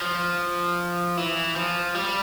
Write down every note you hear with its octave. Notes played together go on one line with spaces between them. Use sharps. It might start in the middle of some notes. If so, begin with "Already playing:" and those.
F3
E3
F3
G3